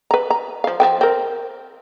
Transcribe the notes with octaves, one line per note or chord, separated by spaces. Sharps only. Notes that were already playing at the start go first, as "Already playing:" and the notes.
B4 A#5
A#5
F3 F5
F3 B4 G5
C4 A#4